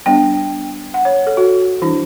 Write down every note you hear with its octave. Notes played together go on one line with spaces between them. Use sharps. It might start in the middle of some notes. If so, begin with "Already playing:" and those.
G3 B3 D4 G5
F#5
C#5
A4
F#4
E3 G3 D4 E4